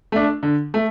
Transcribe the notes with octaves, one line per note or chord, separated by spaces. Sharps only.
A3 D4
D3
A3